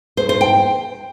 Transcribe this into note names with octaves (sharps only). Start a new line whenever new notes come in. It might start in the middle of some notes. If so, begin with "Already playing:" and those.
C5
C5
G5